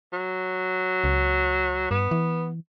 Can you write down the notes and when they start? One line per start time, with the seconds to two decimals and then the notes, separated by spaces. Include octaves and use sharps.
0.13 F#3
1.04 C#2
1.91 G2 B3
2.11 E3